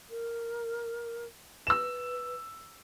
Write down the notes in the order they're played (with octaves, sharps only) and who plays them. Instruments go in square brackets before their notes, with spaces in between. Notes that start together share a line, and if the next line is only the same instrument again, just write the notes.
[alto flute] A#4
[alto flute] B4 [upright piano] E6 E7